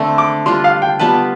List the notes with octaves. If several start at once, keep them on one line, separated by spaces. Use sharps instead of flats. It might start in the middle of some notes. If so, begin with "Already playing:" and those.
Already playing: D3 A3 C4
D6
G3 D4 F4 C6
F5
G5
G3 B3 F4 B4 A5